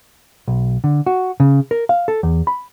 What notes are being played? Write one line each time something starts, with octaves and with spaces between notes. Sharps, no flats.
B1
D3
F#4
C#3
A#4
F5
A4
E2
B5